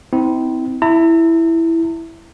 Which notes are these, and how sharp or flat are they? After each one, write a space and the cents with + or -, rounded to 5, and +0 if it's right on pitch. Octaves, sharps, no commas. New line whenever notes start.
C4 -25 E4 -40
E4 +0 A#5 -45